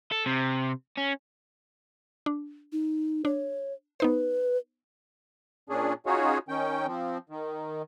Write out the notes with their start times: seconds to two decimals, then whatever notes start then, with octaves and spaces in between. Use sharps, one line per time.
0.12 A4
0.26 C3
0.98 C#4
2.26 D4
2.72 D#4
3.25 D4 C#5
4.00 B3 D#4 B4 C5
5.69 A#2 C#4 D4 G#4
6.06 C#4 D#4 F4 F#4 G#4 C#5
6.49 D#3 C#4 G5
6.87 F3 C4
7.30 D#3